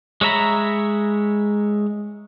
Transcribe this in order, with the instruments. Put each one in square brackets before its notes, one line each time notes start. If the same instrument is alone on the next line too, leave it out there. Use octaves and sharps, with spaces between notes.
[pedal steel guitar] G#3 C#5 E5 A#5 B5